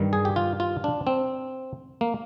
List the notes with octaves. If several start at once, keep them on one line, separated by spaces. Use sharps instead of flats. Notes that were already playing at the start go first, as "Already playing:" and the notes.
Already playing: G2 D#3 G3
G#4
G4
F4
F4
D4
C4
A#3